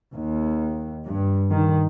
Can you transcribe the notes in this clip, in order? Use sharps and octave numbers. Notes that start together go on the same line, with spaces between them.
D#2
G2
D#3